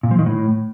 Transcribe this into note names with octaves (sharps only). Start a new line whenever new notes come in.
A#2
F3
D#3
A2